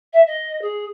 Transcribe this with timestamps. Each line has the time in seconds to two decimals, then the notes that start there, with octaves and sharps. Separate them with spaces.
0.13 E5
0.27 D#5
0.61 G#4